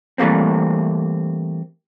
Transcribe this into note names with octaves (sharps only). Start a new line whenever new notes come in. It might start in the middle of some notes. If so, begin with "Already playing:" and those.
E3 G3 A3 A#3 C4